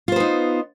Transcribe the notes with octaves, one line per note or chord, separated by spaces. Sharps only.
B3 D#4 F4 C5